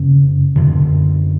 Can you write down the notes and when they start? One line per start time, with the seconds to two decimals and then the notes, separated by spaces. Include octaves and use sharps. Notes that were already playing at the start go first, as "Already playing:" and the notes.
Already playing: F#2 C#3
0.56 F#2 D3